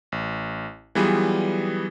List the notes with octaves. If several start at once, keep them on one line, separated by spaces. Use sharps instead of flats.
A1
E3 F#3 G3 B3 F4 G#4